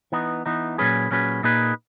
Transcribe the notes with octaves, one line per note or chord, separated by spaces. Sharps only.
E3 B3 D#4
E3 B3 D#4
A#2 F#3 C#4 G#4 B4
A#2 F#3 C#4 G#4 B4
A#2 A#3 D#4 G#4 B4